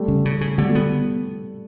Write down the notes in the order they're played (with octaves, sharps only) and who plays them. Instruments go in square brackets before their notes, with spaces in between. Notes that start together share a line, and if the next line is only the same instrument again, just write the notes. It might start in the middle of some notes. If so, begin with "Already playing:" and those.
Already playing: [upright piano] G3 A3
[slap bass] C#3
C#3
C#3
[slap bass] D3 [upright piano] G3 A3
[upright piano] G3 A3
[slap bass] B3